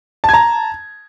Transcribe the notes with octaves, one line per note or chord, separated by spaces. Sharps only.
A5 A#5 G#6